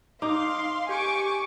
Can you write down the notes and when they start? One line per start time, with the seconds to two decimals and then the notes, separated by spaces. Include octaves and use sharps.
0.22 D#4 F5 C6 D6
0.89 G4 G#5 C#6 D6